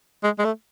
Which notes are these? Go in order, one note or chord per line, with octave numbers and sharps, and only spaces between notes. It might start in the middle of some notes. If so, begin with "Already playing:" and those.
G#3
G#3
A3